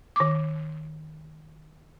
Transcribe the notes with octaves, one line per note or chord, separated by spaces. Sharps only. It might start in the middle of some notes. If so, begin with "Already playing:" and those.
D#3 D6